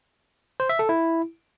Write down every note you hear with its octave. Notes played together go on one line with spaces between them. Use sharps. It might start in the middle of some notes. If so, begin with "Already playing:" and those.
C5
E5
A4
E4